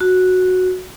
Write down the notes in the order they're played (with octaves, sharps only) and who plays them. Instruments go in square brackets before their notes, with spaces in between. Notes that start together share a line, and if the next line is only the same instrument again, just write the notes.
[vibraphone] F#4